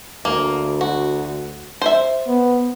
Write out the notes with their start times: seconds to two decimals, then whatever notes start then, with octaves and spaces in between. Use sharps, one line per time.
0.25 D2 A#3
0.81 F#4
1.82 C5 E5
2.27 B3